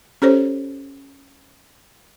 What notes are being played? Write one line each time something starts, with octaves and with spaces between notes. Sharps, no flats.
C#4 G4 A4 C5 C#5